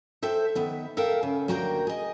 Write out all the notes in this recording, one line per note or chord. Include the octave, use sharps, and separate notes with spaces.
A4 C5 E5 G5
D#3 B3 E5
A4 A#4 E5 F5 G5
C#3
D2 A#3 F#4 G4 A#4 G5
G#4 D#5